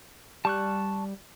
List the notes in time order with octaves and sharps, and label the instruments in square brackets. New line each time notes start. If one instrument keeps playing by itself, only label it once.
[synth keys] G3 [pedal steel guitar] A5 C#6 F#6